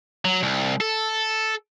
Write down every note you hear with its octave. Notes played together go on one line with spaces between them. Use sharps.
F#3
C2
A4